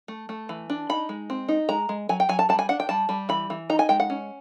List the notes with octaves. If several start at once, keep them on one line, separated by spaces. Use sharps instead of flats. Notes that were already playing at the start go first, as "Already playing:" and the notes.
A3
A3
E3
D4
D#4 B5
G#3
C4
D#4
G#3 A#5
G#3
F#3 G#5
G5
F#3 G#5
A5
G3 A5
G#5
D4 F#5
G5
G3 A5
G3
E3 B5
E3
D#4 A#5
G#5
G#3 G5
F#5
C#4